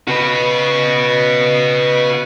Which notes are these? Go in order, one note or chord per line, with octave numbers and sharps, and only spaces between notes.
C#3 F#4 B4